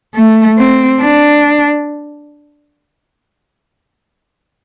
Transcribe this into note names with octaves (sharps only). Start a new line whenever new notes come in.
A3
C4
D4